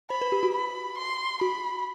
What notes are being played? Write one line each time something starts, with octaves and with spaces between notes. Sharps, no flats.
C5 B5
B4
G4
F#4
B5
C6
F#4 B5